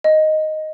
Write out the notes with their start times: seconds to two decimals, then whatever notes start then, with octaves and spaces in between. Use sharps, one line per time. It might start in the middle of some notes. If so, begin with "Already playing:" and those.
0.04 D#5